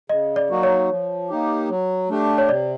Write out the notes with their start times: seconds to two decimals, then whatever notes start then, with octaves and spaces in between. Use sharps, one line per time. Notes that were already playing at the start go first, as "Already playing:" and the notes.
0.09 C#3 D#5
0.36 D5
0.50 F#3 A#3 D#4 F#4
0.63 C#5
0.90 F3
1.29 A#3 D#4 G4
1.69 F#3
2.09 A3 D4 G4
2.38 C#5
2.49 C3 D5